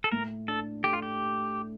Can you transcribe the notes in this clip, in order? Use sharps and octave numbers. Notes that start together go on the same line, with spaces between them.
A4
A2 A#4
D4 A4
A3 G4
F4
G4